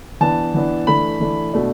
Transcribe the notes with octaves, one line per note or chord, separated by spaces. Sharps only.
E3 B3 D4 A5
E3 B3 D4
E3 A3 D4 B5
E3 A3 D4
B2 A3 D4